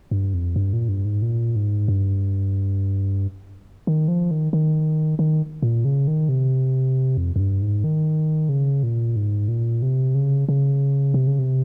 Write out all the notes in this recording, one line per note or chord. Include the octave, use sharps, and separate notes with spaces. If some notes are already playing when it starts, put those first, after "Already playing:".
G2
F2
G2
A#2
G2
G#2
A#2
G#2
G2
D#3
F3
D#3
D#3
D#3
A#2
C#3
D#3
C3
F2
F2
G2
G#2
D#3
C#3
A#2
G#2
A#2
C3
C#3
C#3
C3
C#3
C3